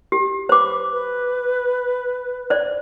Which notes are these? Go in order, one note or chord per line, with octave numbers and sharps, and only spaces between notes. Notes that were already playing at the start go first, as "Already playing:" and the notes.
G4
B4 C5 D6
B4
C5 D5